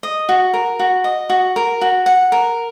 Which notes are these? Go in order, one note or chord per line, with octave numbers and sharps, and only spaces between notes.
D#5
F#4
A#4
F#4
D#5
F#4
A#4
F#4
F#5
A#4